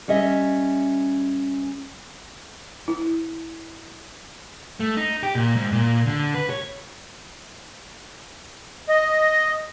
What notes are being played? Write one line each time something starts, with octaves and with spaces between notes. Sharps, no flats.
G3 C#4 D#5 E5
E4
A3
D#4
G4
A#2
G#2
A#2
D3
B4
C#5
D#5